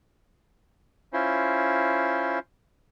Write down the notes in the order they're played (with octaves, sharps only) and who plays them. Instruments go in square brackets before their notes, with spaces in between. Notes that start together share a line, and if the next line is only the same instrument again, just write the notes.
[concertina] C#4 E4 F4 C5